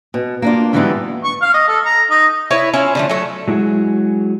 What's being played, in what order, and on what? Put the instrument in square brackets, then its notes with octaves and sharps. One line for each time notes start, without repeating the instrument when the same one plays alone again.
[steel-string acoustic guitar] B2
A#3 D4 F4
G#2 D3 E3 F#3 G3 B3
[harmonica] C#6
F5
D#5
A4
A#5
D#4
[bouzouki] E4 B4 C#5
C#4 E4 F4
D3 F3 A3
F#3 A3
[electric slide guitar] F#3 G#3 E4 F#4 G#4